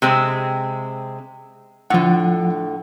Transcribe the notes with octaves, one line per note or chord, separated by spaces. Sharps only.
C3 G#3 C4
A2 D3 F3 F#5